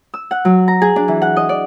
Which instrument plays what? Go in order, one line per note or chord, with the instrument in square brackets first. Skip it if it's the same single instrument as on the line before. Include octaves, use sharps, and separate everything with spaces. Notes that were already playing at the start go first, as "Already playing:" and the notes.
[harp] E6
F#5
F#3
A#5
G#4
D4
E3
F#5
D#5
D5